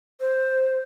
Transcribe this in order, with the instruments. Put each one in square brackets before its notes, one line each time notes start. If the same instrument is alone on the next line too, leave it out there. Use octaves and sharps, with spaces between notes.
[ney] C5